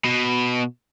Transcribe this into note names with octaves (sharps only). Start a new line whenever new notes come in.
B2